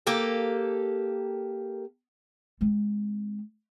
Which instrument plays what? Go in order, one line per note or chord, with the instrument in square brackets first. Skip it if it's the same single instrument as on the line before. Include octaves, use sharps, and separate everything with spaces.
[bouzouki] A#3 G4 A4
[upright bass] G#3 C4